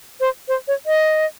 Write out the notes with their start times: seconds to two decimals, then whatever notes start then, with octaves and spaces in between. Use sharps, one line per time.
0.20 C5
0.48 C5
0.68 C#5
0.86 D#5